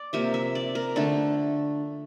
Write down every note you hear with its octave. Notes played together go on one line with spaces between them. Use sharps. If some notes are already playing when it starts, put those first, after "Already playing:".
Already playing: D5
C3 F3 A#3 E5
E5
D5
A#4
D3 A3 A4